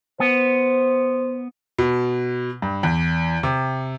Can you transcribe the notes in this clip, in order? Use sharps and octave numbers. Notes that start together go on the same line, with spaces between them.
B3 C5
B2
G2
E2
C3